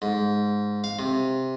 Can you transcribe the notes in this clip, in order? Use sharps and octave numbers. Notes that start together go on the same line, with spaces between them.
G#2
F5
C3